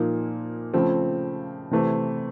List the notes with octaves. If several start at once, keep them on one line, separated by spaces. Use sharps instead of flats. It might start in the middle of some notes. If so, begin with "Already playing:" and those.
Already playing: A#2 F3 A#3 D#4
C#3 F3 A3 C4
C3 E3 A3 C4